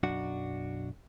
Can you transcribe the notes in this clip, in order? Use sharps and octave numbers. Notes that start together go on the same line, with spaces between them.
B1 F#2 D4 F#4